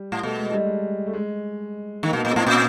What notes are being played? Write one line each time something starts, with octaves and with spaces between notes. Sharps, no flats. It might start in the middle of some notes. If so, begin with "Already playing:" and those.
Already playing: G3
A2
B2 A3
G#3
G3
G#3
A3
G#3
D#3 A#3
B2
B3
A#2
A2 C4
A#2 C#4